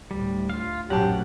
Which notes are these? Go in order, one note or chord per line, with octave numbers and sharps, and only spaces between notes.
D2 A2 G3
F4 F5
A#1 F#2 A2 C#4 G4 F#5 A5